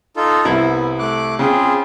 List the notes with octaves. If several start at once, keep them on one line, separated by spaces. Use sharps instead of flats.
D#4 F4 A4
C2 B3 E4
A3 D6 F#6
C#3 C4 F4 G#4